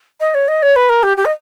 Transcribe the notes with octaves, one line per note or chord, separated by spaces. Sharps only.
D#5
C#5
D#5
C#5
B4
A#4
G4
G4
D#5